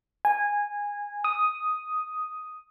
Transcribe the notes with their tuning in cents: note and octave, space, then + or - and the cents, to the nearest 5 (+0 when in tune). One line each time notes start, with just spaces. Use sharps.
G#5 -15
D#6 +5